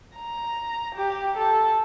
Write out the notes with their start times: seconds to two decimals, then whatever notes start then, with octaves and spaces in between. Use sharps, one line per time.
0.17 A#5
0.95 G4
1.37 A4